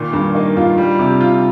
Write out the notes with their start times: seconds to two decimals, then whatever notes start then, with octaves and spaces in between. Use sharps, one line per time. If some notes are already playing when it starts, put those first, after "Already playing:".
Already playing: A#2 D#3 F4
0.13 G2
0.35 A#3 D#4
0.57 G2 F4
0.78 G3
0.99 C3
1.21 F4